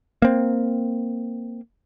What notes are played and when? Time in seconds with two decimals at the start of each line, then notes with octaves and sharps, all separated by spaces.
0.22 A#3 C4